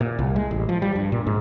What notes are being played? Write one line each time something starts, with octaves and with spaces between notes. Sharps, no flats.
A#2
C2
G#3
A1
F3
G3
G2
A#2
G#2